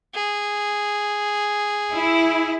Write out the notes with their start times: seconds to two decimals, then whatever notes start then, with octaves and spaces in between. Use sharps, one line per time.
0.14 G#4
1.92 E4